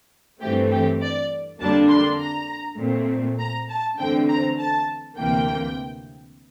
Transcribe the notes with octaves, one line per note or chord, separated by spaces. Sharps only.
G2 E3 A3 C4 G4
G4
D5
F2 D3 G3 A#3 D4 A5
C6
A#5
A#2 A3 C4
A#5
A5
E2 D3 A3 C4 G5
A#5
A5
D2 C3 E3 A#3 G5